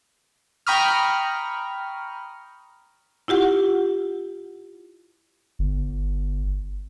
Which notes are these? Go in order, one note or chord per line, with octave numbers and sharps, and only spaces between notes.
G5 A#5 B5 C#6 D#6 F6
E4 F4 G4 F#5
G1